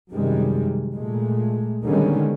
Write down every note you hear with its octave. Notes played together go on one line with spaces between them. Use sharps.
F#2 C3 D#3 G3 G#3
A#2 G#3 A3
D3 D#3 G3 G#3 B3 C#4